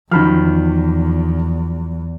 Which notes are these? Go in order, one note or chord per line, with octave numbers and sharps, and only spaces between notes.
E2 D#3 F3 F#3 B5 F6